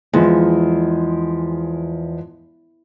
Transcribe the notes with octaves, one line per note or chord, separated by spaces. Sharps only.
E2 F3 G#3